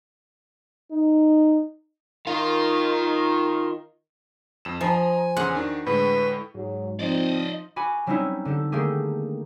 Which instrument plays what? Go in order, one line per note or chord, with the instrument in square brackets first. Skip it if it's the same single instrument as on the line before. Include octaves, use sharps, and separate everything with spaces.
[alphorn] D#4
[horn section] D#3 [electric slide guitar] F4 F5
[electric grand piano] F2 E7
[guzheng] F3 [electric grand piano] D#5 A#5 B5 [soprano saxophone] G#5
[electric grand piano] E2 C#3 C6 [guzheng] F#5
[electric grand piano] D#3 D4 F#4
[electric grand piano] A2 D3 G#3 [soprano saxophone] B4
[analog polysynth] G#2 [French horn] F#3
[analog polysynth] F3 D#4 [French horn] C4 [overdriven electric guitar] D5 D#5
[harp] F#4 G#5 B5 D6
F#3 G3 C4 C#4 D#4 E4
D3 G4 A4
D3 D#3 A3 A#3 G4 G#4